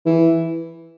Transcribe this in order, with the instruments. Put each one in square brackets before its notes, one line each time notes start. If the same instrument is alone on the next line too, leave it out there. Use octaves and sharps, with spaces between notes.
[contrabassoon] E3